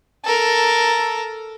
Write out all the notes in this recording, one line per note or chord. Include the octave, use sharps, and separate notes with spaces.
A4 A#4